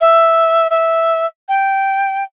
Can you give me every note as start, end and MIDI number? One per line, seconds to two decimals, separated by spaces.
0.01 0.67 76
0.70 1.26 76
1.49 2.23 79